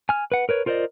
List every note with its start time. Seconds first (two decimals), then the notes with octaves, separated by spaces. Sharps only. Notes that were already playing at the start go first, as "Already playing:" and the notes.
0.09 G#5 F6
0.32 B4 F#5
0.49 A#4 B4 C#5
0.66 F4 A#4 C5 D5 D#5